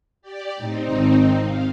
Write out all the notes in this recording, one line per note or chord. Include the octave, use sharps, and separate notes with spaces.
G4 D5
A2 C4 D#4
G#1 D#3
C3 F5